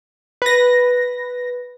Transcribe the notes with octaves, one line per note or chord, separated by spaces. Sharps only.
B4 A#6